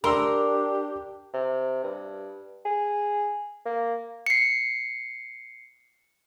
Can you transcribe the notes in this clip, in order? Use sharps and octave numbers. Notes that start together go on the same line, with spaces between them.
D4 G4 A#4 A#5 C6 E6
C3
G2
G#4
A#3
C7 C#7